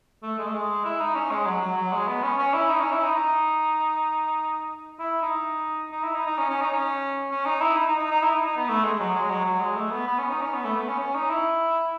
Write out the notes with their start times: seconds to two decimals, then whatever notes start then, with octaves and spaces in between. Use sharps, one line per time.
0.23 A3
0.38 G#3
0.46 A3
0.54 G#3
0.85 E4
1.00 D#4
1.15 C#4
1.31 G#3
1.46 F#3
1.62 F#3
1.77 F#3
1.92 G#3
2.08 B3
2.23 C#4
2.38 C#4
2.54 E4
2.69 D#4
2.80 C#4
2.92 E4
3.04 D#4
3.15 D#4
4.99 E4
5.22 D#4
5.92 D#4
6.04 E4
6.15 D#4
6.26 D#4
6.38 C#4
6.49 C#4
6.61 D#4
6.72 C#4
7.31 C#4
7.45 D#4
7.61 E4
7.77 D#4
7.88 D#4
7.99 D#4
8.11 D#4
8.22 E4
8.34 D#4
8.46 D#4
8.57 B3
8.69 A3
8.84 G#3
9.00 F#3
9.15 G#3
9.30 F#3
9.45 F#3
9.60 G#3
9.76 A3
9.91 B3
10.07 B3
10.19 C#4
10.30 D#4
10.41 C#4
10.53 B3
10.65 A3
10.76 B3
10.88 C#4
11.00 C#4
11.15 D#4
11.30 E4